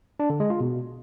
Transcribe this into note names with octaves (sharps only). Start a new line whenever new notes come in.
D4
D3
G#3
F4
B2